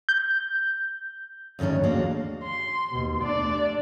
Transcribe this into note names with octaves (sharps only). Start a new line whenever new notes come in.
G6
D2 G#2 D#3 C#4 D4
D#2 G#3 A#3 D4 F#4
C6
D#2 B2
A3 D4 D5